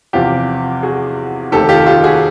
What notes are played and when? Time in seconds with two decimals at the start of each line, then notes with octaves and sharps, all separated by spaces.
0.13 E2 C3 F3 F4 G4
0.83 F#4 G#4
1.52 F1 D#2 D#3 G4 A4
1.69 F4 G4
1.86 F4 G4
2.04 F#4 G#4